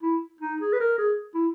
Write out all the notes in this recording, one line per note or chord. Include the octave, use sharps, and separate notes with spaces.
E4
D#4
G#4
B4
A#4
G#4
E4